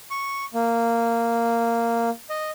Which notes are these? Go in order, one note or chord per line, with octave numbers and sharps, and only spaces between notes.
C#6
A#3
D#5